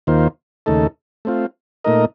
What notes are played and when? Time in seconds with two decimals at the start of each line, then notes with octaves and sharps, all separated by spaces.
0.07 D#2 D#3 A#3 F4 C5
0.66 D#2 C#3 A3 D#4 A4
1.25 A3 C4 F4
1.84 A#2 A3 D#4 A#4 D#5